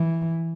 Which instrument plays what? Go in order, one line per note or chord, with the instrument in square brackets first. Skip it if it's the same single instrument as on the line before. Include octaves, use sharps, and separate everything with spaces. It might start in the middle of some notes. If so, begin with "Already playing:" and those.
Already playing: [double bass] E3